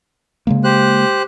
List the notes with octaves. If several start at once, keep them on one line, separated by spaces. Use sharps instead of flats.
C#3 G#3 A#3
G4 C5 F#6